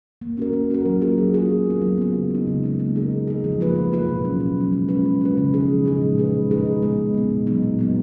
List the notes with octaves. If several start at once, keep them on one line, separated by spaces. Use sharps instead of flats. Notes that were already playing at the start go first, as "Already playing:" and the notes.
A#3
C#4 F#4 A#4
A#3
C#4 F#4 A#4
F#3
A#3 F4 G#4
F#3
A#3 F4 G#4
F#3
B3 F4
F#3
B3 F4
C#3
G#3 D#4
C#3
G#3 D#4
A#3
D#4 G#4
A#3
D#4 G#4
F3
A#3 F4 B4
F3
A#3 F4 B4
B2
F#3 C#4
B2
F#3 C#4
G#3
C#4 F4 B4
G#3
C#4 F4 B4
C#3
F3 G#3 D#4 G#4
C#3
F3 G#3 D#4 G#4
A#2
G#3 D#4 G#4 B4
A#2
G#3 D#4 G#4 B4
B2
G#3 B3
B2
G#3 B3
A#2
F#3 B3 D#4
A#2
F#3 B3 D#4